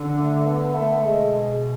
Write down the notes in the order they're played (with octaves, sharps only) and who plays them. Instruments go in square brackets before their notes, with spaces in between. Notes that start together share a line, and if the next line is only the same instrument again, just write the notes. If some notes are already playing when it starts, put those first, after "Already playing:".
Already playing: [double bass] D3
[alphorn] A3
B3
A3
[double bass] B2 [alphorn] G#3